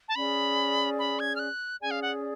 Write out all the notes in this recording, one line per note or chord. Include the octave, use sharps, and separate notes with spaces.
A5
C#4 G#4 D5 B5
B5
G#6
F6
F#6
C#4 G#4 D5 G#5
F5
F#5